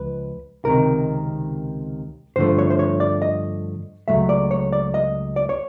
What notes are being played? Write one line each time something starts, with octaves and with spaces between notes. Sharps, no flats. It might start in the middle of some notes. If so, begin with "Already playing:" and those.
Already playing: C#2 F3 B4
C#2 C3 D#3 A#4
G2 D3 F3 A3 C5
C#5
C5
C#5
D5
D#5
C#2 C#3 F#3 A3 E5
D5
C#5
D5
D#5
D5
C#5